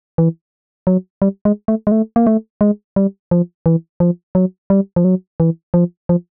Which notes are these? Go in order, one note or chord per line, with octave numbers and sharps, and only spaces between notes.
E3
F#3
G3
G#3
A3
G#3
A3
A#3
A3
G#3
G3
F3
E3
F3
F#3
G3
F3
F#3
E3
F3
F3